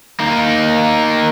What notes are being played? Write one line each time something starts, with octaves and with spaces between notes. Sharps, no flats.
A#3 D#4